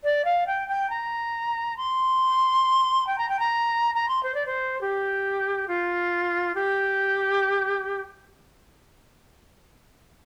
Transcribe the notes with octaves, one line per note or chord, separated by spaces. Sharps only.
D5
F5
G5
G5
A#5
C6
G5
A#5
G5
A#5
A#5
C6
C5
D5
C5
G4
F4
G4